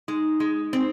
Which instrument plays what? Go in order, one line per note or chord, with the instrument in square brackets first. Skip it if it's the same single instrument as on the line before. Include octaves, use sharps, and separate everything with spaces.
[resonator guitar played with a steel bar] G#3 [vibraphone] D#4
[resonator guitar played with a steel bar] G#3
C4